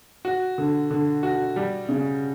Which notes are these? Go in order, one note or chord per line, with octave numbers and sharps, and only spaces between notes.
F#4
D3
D3
F#4
G3
C#3